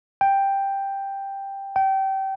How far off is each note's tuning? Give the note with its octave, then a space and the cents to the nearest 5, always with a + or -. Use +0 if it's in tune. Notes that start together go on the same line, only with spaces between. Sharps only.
G5 +5
G5 -25